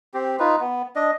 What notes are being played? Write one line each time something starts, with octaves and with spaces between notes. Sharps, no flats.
C4 G4
D#4 F4 B4
B3
D4 D#5